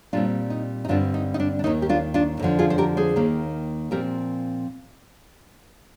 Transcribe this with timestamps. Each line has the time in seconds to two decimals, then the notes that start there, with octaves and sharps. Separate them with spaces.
0.13 A#2 G3 C4 D4 F4
0.50 D#4
0.85 D#4
0.88 G2 D3 G3 C4 D4 F4
1.14 D#4
1.34 D#4
1.40 D4
1.59 D4
1.64 D#2 D#3 A#3 D#4
1.82 G4
1.89 D4 F4
2.14 D4 F4
2.40 F2 D3 F3
2.59 F4 G#4
2.70 C5
2.78 G4 A#4
2.97 G#4 C5
3.16 D#2 D#3 A#3
3.91 A#2 F3 C4 G4 A#4